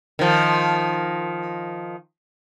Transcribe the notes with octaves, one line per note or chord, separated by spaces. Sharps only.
D#3 F3